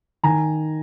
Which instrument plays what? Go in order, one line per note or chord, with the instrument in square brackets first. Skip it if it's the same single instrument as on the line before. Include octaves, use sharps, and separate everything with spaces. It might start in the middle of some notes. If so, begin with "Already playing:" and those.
[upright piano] D#3 G#5 A#5